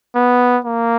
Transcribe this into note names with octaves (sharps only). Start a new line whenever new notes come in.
B3
A#3